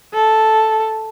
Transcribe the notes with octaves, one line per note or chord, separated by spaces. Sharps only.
A4